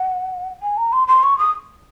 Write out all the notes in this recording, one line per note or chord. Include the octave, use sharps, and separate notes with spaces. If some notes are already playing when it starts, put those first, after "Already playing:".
Already playing: F#5
G#5
A#5
C6
C6
C#6
D#6